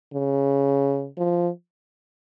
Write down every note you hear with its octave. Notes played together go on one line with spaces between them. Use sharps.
C#3
F3